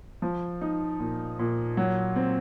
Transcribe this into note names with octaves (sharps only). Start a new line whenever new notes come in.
F3
D#4
A#2
A#2
F#3
C4